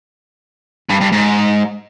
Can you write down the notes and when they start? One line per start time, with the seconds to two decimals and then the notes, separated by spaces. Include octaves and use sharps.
0.90 G2
1.01 G2
1.13 G#2